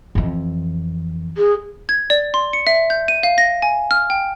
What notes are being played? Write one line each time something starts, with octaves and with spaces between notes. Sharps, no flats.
F2 E3
G#4
G#6
D5
C6
C#7
E5
G6
D#7
F5
A#6
G#5
F6
G5